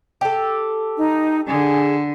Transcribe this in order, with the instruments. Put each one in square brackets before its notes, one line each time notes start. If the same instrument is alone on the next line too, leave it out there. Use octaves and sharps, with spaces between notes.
[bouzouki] G4 A4
[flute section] D#4
[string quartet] D3 [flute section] G#4